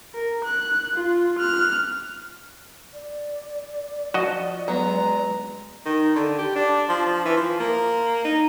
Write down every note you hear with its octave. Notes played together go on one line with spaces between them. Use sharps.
A#4
F#6
F4
F6 F#6
D5
F3 F#4 D#5
F#3 G#3 B3 A#5
D#3
D3
G4
D4
F3
F3
E3
F3
A#3
D#4